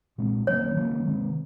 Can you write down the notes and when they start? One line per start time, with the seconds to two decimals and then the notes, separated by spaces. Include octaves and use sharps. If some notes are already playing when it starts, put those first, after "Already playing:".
0.18 A#2 G#3 C4
0.47 D#3 F#3 A#3 C#4 C#5
0.76 D#3 F#3 A#3 C#4
1.05 C3 D#3 G#3 C4